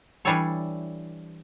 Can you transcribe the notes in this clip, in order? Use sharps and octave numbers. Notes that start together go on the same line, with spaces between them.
E3 G3 D4 A4 C#5